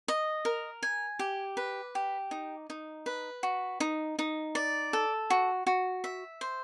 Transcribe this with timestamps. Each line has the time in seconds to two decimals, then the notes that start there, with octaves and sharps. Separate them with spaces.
0.08 D#5
0.45 A#4
0.83 G#5
1.19 G4
1.57 B4
1.95 G4
2.31 D#4
2.70 D#4
3.06 B4
3.43 F#4
3.80 D#4
4.19 D#4
4.55 D5
4.93 A4
5.30 F#4
5.67 F#4
6.04 E5
6.41 C5